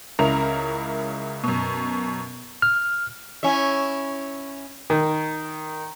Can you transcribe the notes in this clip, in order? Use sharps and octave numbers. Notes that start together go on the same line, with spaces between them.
C#2 C#3 E4 A#4 A#5 F7
F#2 B2
F6
C#4 E4 E5
D#3